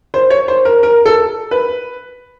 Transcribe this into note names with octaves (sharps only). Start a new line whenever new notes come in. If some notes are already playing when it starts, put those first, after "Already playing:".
C5
C#5
C5
A#4
A#4
A4
B4